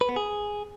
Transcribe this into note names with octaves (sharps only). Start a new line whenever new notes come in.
B4
B3
G#4